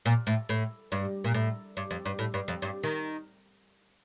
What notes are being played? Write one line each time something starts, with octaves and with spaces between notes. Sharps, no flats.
A#2
A2
A2
G2
A#2
A2
G2
F2
G2
A2
G2
F2
G2
D#3